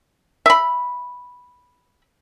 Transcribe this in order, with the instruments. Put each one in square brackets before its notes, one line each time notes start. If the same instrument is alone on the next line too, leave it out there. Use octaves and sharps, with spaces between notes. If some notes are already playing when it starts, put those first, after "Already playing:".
[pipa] E5 B5